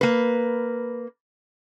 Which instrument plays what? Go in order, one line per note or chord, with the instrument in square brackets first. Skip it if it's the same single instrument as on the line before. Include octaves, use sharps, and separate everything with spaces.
[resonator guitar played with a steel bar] A#3 B4